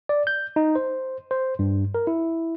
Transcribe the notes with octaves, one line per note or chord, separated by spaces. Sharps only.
D5
G6
D#4
C5
C5
G2
A#4
E4